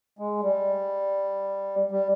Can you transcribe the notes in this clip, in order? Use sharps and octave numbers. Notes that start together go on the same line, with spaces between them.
G#3
G3
G3